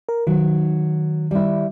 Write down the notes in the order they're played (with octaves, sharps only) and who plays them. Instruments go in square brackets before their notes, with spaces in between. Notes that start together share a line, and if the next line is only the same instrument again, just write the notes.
[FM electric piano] A#4
[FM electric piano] D#3 [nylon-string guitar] F#3
[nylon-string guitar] G3 E4